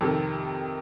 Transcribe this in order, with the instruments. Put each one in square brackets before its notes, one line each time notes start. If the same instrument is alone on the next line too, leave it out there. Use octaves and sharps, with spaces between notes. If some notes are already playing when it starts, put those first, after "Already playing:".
[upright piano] F2 C3 D#3 A4